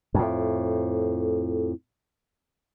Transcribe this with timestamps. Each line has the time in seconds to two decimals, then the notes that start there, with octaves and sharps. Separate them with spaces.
0.14 F2 A2